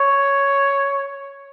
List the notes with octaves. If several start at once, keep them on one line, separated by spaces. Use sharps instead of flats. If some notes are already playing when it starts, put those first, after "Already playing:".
Already playing: C#5